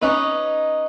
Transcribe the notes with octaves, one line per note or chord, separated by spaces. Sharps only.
C#4 D#4 B4